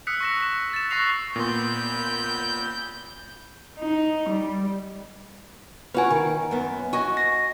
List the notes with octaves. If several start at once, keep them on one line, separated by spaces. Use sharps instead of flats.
D#6 E6 F#6 B6 C#7
C#6 A#6 E7
B6 E7
A6 E7
C#6 E6 F#6 A#6 C7 F7
A#2 B3 B5 C6 G6
D#4
G3
C#4 F#4 B4 G#5
D#3
F#2 B3
F#4 D#5 G#5
A#6